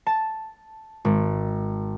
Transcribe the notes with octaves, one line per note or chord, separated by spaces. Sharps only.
A5 E7
G#1